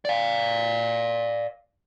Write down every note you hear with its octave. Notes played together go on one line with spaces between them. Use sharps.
D5 F5